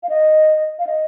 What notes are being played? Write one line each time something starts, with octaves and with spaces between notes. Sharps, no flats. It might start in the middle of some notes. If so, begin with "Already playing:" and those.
F5
D#5
F5
D#5